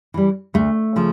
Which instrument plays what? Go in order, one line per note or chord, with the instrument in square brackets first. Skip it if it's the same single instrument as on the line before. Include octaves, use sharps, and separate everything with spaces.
[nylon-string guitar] E3 G3
D2 A3
C#3 F3